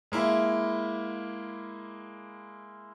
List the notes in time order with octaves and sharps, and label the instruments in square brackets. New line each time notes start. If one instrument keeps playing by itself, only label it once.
[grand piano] G#3 A#3 E4